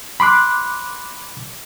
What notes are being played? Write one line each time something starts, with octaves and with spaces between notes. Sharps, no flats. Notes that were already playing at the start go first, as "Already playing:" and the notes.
B5 C6 D6 F#6